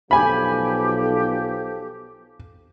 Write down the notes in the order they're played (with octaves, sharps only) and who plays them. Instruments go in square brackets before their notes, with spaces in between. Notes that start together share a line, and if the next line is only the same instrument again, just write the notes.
[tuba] B1 [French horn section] F3 A4 [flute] G4 [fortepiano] G#5 B5